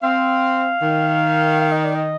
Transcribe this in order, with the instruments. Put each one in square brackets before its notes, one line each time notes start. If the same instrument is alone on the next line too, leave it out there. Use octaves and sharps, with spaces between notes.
[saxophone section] C4 [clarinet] F5
[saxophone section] D#3
[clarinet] F5
D#5
D5
D#5